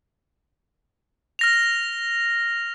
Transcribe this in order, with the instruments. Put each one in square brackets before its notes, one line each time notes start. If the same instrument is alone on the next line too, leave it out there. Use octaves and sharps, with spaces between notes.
[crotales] F6 A#6 F7